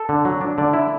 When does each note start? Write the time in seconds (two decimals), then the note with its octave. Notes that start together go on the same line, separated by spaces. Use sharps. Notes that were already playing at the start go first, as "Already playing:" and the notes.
Already playing: A4
0.09 D3
0.25 F#3
0.41 D4
0.58 D3 D5
0.73 E4